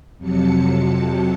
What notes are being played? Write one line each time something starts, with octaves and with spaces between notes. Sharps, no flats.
F2 C3 F#3 A5 C#7